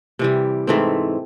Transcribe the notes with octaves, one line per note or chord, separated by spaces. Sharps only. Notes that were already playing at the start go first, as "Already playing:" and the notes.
C3 E3 G3
G#2 E3 A3 C4